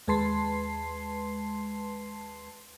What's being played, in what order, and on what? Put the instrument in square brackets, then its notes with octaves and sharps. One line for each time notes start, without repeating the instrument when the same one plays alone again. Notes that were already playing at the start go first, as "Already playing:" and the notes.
[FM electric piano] D#2 G#3 B4 A5 C6 C7